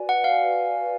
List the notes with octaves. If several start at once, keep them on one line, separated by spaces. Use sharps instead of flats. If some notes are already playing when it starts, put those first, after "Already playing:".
Already playing: F#4 B4 D5 G#5
F#5
F5